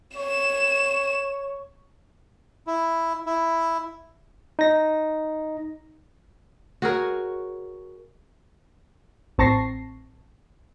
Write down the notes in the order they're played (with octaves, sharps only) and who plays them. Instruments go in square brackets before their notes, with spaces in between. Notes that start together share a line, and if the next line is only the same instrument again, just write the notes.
[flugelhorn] C#5 [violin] E7
[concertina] E4
E4
[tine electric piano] D#4 A#6
[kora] F#4 G#4 A#4 C#5
[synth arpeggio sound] A1 C4 A5 C#6 A#6 C7